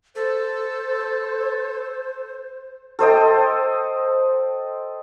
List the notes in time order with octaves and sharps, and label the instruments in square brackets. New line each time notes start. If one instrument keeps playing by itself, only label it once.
[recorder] A4 [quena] C5
[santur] A4 C5 D#5 G5